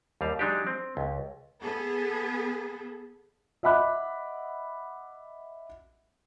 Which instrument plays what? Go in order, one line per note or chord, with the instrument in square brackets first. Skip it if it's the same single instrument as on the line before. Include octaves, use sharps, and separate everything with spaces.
[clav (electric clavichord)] D#2 G3 F5
F#3 G#3 D4 D#4 G4
C4
C#2
[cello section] B3 G#4 A4
[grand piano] D#5 E5 F#5 B5 D6 F#6